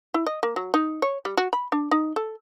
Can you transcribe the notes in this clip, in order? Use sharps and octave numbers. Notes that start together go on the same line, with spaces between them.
E4
D#5
A#3
F#3
D#4
C#5
G3
F#4
B5
D4
D#4
A4